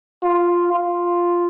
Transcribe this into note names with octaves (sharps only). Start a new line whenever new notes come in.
F4
F4